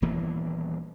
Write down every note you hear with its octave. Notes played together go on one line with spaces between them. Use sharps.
D#1 E3 A#3 B3